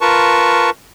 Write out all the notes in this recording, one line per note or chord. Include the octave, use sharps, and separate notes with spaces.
F4 A#4 B4 A5 C#6